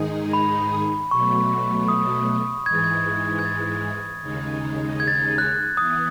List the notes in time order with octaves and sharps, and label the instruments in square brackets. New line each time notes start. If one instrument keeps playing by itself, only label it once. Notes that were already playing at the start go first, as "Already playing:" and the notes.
Already playing: [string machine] G#2 D#3 G#3 D#4 G#4
[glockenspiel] B5
[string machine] B2 F#3 A3 [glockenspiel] C#6
[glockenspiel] D#6
[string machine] G#2 E3 G#3 [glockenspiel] G#6
[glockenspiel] A6
G#6
G#6
A6
[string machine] D#2 C#3 G#3 D#4
[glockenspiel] G#6
A6
G#6
F#6
[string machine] E3 B3 [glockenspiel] D#6